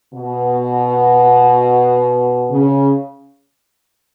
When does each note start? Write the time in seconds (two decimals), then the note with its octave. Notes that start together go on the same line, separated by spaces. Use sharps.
0.13 B2
2.50 C#3